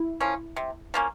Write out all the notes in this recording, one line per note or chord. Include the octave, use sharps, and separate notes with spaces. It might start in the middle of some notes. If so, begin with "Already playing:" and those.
Already playing: E4
F3 A#3 C#4
C3
F3 A#3 C#4